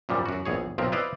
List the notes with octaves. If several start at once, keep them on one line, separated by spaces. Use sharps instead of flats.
F#2 A#2 F3 G3
F#2 F#4
A#1 E2 G#4 C#5
B1 F3 C4 A#4
E4 B4 C5 D5 D#5 F5